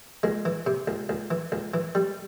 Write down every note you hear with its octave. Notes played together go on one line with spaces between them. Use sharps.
C#2 G#3
E3
C3
C#2
C#2
E3
C#2
E3
G3